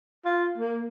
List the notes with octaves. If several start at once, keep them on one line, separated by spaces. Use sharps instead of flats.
F4
A#3